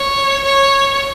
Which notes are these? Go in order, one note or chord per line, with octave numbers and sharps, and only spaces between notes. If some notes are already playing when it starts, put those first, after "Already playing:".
Already playing: C#5
C#5